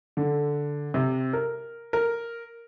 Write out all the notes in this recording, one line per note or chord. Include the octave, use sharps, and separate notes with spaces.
D3
C3
A#4
A#4